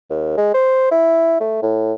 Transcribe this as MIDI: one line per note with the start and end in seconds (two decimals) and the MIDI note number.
0.10 0.36 39
0.37 0.52 56
0.54 0.90 72
0.92 1.39 64
1.41 1.61 57
1.62 1.93 45